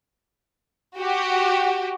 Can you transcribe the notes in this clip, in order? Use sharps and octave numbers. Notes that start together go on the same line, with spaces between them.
F#4 G4